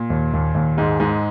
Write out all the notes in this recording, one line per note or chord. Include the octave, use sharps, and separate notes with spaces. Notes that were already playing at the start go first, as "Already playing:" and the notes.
Already playing: A#2
D#2
D#2
D#2
G#2 G#3
G#2 G#3